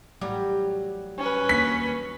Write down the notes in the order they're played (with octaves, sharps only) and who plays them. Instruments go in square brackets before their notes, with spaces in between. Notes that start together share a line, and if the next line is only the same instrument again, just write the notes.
[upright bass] A1 [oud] F#3 G3 G4
[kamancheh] C#4 B4
[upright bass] D#2 [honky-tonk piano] B6